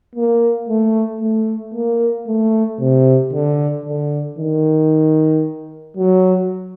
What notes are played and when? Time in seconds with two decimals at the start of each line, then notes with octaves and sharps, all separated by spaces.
0.15 A#3
0.68 A3
1.21 A3
1.74 A#3
2.27 A3
2.79 C3
3.33 D3
3.85 D3
4.38 D#3
5.97 F#3